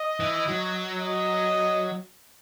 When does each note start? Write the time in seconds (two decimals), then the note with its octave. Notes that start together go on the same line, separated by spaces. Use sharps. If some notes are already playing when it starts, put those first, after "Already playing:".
Already playing: D#5
0.20 E3
0.48 F#3
1.00 D#5